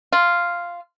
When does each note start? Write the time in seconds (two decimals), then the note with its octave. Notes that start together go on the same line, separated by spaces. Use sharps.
0.13 F4